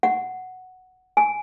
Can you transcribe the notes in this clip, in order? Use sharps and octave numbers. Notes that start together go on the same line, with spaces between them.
F#5
G#5